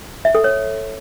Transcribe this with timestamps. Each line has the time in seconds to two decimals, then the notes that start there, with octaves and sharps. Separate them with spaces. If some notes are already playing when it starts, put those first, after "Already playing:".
0.25 E5
0.35 A4
0.44 C#5